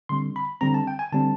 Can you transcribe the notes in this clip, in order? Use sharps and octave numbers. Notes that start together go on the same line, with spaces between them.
D3 G3 C4 C6
B5
D3 G3 C4 A#5
A5
G5
G#5
D3 G3 C4 A5